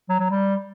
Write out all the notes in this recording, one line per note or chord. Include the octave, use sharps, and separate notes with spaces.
F#3
F#3
G3